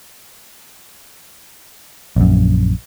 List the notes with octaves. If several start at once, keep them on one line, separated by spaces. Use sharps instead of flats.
A#1 F#2